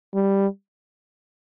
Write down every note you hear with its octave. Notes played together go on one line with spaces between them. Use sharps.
G3